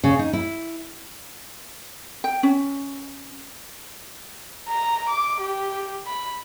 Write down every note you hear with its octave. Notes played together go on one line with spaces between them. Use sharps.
C#3
D#4
E4
G5
C#4
A#5
D6
G4
B5